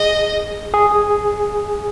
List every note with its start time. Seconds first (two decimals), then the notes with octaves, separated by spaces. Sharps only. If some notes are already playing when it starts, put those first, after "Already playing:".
Already playing: G#4 D#5
0.74 G#4